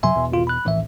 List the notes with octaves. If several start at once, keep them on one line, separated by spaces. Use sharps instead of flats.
F#2 C3 F#3 E5 G#5 C6
E2 B2
G#1 F4
B5 F#6
D#1 A#1 A2 E3 E5